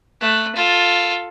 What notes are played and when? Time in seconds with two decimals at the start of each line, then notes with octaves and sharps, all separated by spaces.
0.21 A3 F#6
0.55 F4 A4